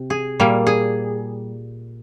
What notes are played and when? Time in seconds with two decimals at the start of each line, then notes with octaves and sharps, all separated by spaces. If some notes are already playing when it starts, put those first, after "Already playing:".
Already playing: C3
0.10 G#4
0.40 A#2 G3 A#3
0.67 G#4